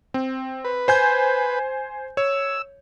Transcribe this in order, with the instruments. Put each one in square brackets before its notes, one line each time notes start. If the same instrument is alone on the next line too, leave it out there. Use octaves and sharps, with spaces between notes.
[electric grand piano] C4
[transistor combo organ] B4
[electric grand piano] C5 G#5 G6
[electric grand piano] C#5 [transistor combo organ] E6